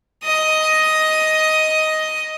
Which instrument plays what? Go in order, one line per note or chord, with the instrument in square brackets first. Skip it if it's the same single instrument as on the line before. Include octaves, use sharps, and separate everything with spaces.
[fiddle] D#5 D#6